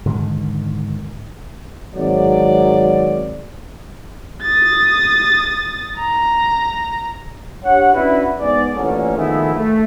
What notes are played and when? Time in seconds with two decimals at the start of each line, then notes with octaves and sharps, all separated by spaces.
0.06 G#2 D3 D#3
1.95 G#1 F#3 D5
4.43 D#6 A6
5.97 A#5
7.64 D4 G4 C#5 F#5
7.93 C#4 D4 E4 F#4 B4
8.39 G#2 B3 G#4 D5
8.74 A1 A#2 D3 A#3 C#4
9.16 D#3 F3 G#3 A3 B3 E4
9.53 A3